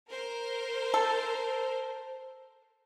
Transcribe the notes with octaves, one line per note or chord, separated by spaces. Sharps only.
A#4 C5
A4